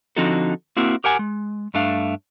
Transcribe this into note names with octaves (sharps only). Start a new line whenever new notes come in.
D3 F3 C4 D#4 F#4 A4
A#3 C4 E4 F#4 A#4
G4 A#4 F#5 G#5
G#3
G2 A3 D4 F5